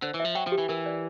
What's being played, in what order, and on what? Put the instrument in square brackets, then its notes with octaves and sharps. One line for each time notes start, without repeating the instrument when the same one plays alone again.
[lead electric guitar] D3 [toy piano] C5
[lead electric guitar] E3
[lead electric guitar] F3 [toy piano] E5
[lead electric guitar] F#3 [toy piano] G5
[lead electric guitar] F3
[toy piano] G4
[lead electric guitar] E3
[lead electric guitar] E3 [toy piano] A#4
[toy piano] D5